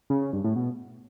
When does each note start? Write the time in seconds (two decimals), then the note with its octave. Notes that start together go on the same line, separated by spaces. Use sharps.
0.10 C#3
0.21 C#3
0.33 G2
0.44 A2
0.56 B2